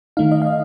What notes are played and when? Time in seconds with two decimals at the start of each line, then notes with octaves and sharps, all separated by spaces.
0.17 D#3 A3 D#4 F5
0.32 D#5
0.42 F5
0.46 D#5